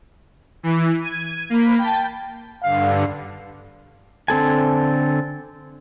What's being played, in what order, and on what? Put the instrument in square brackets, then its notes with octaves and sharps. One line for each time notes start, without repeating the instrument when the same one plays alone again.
[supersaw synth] E3
G#6 D#7
A#3 B5
G5 A5
[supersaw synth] G2 D3 [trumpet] F5
[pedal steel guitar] D3 C4 A4 G#5